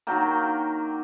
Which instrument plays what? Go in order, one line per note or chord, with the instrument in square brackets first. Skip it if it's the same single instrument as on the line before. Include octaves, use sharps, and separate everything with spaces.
[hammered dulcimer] D#3 F#3 A#3 G5